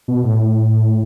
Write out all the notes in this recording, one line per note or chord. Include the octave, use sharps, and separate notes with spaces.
B2
A2